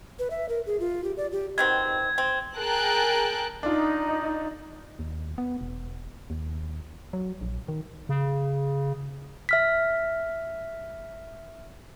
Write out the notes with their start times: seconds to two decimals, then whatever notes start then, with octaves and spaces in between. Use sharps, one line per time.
0.19 B4
0.30 E5
0.49 A#4
0.66 G#4
0.80 F4
1.04 G4
1.17 D5
1.32 G4
1.58 B2 D#3 C4 G#6
2.18 C4
2.57 G#4 A#4 G5 A5 F#6
3.63 D4 D#4 F4
4.99 D#2
5.38 B3
5.61 E1
6.30 D#2
7.13 F#3
7.41 A#1
7.68 D#3
8.09 C#3
9.49 E5 F6 B6